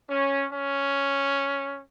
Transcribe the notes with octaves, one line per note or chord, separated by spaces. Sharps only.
C#4
C#4